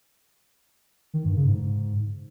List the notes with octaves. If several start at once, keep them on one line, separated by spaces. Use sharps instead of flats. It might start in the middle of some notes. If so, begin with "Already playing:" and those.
D#3
G2
C#3
G#2